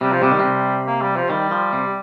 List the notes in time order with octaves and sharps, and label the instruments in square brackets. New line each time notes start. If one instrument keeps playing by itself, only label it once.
[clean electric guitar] C3 [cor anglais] G3
[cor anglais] F3
[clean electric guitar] C3 [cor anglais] G3
[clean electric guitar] D#3
C3
[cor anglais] A#3
G3
F3
[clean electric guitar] D#3 [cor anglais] G3
[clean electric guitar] F3
C3